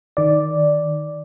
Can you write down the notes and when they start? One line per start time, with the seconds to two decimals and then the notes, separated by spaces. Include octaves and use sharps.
0.17 D#3 D5